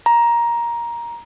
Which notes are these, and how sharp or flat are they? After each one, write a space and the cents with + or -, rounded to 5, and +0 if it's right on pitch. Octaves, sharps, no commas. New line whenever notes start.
A#5 +15